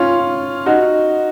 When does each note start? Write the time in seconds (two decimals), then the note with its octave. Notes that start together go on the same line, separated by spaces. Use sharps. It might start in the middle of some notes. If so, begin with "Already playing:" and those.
Already playing: C#4 F4
0.66 D#4 F#4